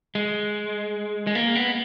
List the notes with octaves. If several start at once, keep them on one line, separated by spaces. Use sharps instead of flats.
G#3
G#3
A#3
B3